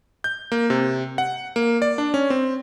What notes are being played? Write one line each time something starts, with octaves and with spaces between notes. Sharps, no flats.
G6
A#3
C3
F#5
A#3
D5
D4
C#4
C4